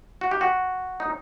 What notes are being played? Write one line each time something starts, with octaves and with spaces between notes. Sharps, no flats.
F#4
G4
F#4
D#4